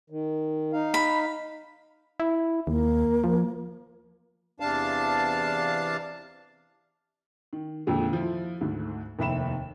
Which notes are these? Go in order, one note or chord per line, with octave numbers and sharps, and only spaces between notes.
D#3
D#4 F5
B5
E4
D#2 A#3
F3
E2 C3 D4 F5 A5
D#3
F2 A#2 D3 G#3
F3 E4
D2 G#2 D3
F1 D#2 E5 B5 E7